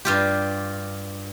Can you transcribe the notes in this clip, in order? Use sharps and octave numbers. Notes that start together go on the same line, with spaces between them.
G2 F4 G4